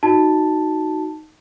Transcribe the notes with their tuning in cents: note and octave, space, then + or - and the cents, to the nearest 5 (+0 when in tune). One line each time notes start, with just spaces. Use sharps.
D#4 +0 F#4 +0 A5 +0